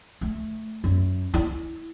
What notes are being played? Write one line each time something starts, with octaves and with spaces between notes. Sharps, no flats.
A3
F#2
E4